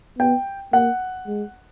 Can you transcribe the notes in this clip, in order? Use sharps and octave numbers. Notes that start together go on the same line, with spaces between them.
B3 G5
A#3 F#5
G#3